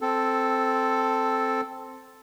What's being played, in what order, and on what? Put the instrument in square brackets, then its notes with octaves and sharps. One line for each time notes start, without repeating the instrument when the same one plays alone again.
[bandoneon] C4 A4